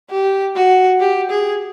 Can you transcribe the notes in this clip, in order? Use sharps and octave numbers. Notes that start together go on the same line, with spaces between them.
G4
F#4
G4
G#4